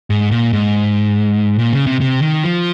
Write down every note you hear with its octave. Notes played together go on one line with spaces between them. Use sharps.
G#2
A#2
G#2
A#2
C#3
C3
C3
D#3
F3